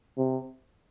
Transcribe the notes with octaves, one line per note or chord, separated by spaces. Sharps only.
C3